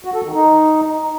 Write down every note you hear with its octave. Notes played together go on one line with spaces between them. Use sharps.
F#4
A4
D#3
D#4